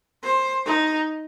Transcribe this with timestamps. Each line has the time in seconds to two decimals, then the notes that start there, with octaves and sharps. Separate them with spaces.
0.23 C5
0.66 D#4